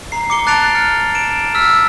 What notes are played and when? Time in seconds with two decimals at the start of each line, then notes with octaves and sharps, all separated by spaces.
0.12 A#5 C7
0.30 D6 C#7 G7
0.46 A5 F#6 A6 C7 D7 F7
0.75 F6 C#7
1.15 D7 E7
1.55 E6 F6 B6